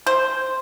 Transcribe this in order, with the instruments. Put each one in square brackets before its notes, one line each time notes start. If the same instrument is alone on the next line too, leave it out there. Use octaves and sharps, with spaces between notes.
[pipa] C5